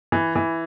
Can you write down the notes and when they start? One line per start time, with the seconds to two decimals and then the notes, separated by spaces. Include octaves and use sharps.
0.12 E3
0.36 E3